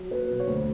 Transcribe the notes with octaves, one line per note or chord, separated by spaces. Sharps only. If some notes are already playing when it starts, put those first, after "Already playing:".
Already playing: F#3
A#3 B4
B2
C#5
D2 C5